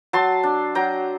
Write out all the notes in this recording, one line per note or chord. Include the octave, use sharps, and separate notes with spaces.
F#3 A5 C6
D4
F#3 G5 A#5